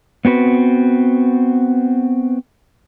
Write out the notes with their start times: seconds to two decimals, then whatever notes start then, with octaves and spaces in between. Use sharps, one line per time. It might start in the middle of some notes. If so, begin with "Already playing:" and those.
0.25 B3 C4 F#4 B4